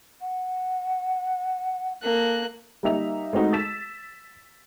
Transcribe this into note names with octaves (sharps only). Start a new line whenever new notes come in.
F#5
A#3 A4 F#6
G3 A#3 D#4 E5 F7
G#3 A3 C4 D#4 F#4
E6 A6 B6 E7